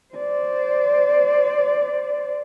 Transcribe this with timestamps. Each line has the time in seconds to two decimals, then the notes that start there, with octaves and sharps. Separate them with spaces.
0.14 C5 D5